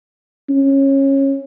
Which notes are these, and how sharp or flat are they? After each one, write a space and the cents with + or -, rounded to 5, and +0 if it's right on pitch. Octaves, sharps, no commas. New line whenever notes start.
C#4 -20